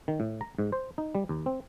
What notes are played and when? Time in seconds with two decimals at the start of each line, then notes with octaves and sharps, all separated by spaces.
0.08 D#3
0.20 A2
0.41 A#5
0.59 G#2
0.72 C5
0.98 D#4
1.15 G3
1.29 D#2
1.46 C4